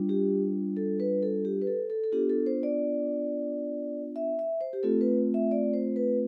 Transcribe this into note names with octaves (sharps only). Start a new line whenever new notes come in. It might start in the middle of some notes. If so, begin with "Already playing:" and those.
Already playing: G3 D4 F4
G4
A4
B4
A4
G4
B4
A4
A4
A4
B3 D4 F4 G4
A4
C5
D5
E5
E5
C5
G4
A3 C4 F4 A4
B4
E5
D5
C5
B4